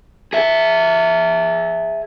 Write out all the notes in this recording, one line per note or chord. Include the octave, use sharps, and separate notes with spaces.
G#4 E5